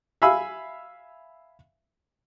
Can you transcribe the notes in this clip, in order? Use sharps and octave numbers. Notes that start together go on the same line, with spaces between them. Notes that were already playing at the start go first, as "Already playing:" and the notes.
E5 F5 G#5 B5 E6